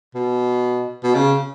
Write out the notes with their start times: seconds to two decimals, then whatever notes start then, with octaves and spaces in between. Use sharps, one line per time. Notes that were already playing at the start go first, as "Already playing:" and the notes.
0.15 B2
1.04 B2
1.15 C#3